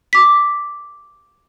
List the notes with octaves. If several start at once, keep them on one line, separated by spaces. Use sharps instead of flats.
D6 B6